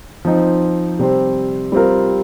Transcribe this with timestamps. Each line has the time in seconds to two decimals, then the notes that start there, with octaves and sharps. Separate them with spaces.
0.25 F3 C4 D#4
0.99 C3 G3 C4
1.72 G3 C4 F4 A#4